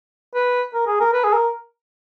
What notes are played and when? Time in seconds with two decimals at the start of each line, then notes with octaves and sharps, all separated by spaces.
0.35 B4
0.74 A#4
0.87 G#4
1.00 A#4
1.13 B4
1.24 G#4
1.33 A#4